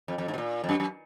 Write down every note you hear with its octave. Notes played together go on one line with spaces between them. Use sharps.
F2
F2
G#2
B2
A#2
F2
F#2
F#2